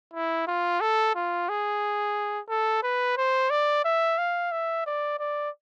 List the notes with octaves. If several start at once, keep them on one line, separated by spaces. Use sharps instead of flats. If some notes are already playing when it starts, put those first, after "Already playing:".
E4
F4
A4
F4
G#4
A4
B4
C5
D5
E5
F5
E5
D5
D5